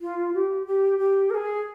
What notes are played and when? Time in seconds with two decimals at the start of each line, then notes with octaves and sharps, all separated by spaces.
0.01 F4
0.34 G4
0.67 G4
0.99 G4
1.30 A#4
1.34 G#4